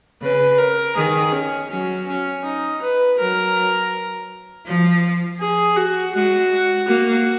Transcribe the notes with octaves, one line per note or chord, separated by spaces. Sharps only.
C#3 B4
A#4
D#3 G#4
C#4
F#3 C#4
C#4
D#4
B4
F#3 A#4
F3
G#4
F#4
G#3 F#4
A#3 F#4